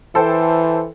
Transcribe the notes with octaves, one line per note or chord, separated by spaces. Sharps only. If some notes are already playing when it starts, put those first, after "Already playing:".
E3 A4 C5 G5